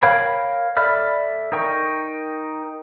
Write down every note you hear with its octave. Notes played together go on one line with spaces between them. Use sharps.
A#4 C#5 F5 G5 B5
A4 D5 E5 B5 F6
D#4 A#4 G5 C#6